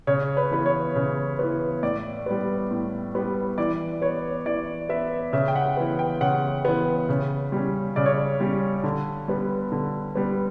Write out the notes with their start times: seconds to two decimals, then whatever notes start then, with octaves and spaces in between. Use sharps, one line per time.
0.07 C#3 C#5
0.37 B4
0.51 E3 B3 B4
0.66 C#5
0.96 C#3
1.39 E3 B3
1.83 A2 D5
2.26 G3 B3
2.71 A2
3.15 G3 B3
3.58 E3 D5
4.02 B3 C#5
4.46 E3 D5
4.89 B3 E5
5.33 C#3 E5
5.48 G5
5.56 F#5
5.77 E3 B3
5.99 G5
6.21 C#3 F#5
6.65 E3 B3
7.09 C#3
7.52 G3 C#4
7.96 C#3 D5
8.06 C#5
8.15 D5
8.40 G3 C#4
8.83 D3
9.28 G3 B3
9.72 D3
10.15 G3 B3